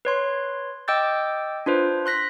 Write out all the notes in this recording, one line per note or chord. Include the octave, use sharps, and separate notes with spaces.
B4 C#5 C6
D#5 G5 D6 E6 G6 A6
D4 F4 B4 C5
C6 F#6 A#6 B6